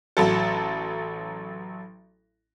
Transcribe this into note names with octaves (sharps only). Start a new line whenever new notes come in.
A1 F#3 A4